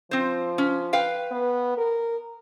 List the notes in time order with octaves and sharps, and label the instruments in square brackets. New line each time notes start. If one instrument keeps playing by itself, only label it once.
[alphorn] F3 [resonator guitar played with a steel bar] C4 C5
[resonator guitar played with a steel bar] C#4
B4 F5 G5
[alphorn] B3
A#4